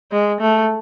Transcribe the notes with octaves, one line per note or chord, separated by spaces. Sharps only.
G#3
A3